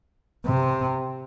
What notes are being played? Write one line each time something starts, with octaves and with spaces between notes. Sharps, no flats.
C3